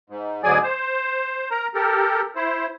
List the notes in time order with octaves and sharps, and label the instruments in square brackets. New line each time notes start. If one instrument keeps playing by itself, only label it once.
[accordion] G#2
D2 G#2 F#3 G#4 D5 G#5
C5
A#4 A#5
G4 A4 A#4
E4 C5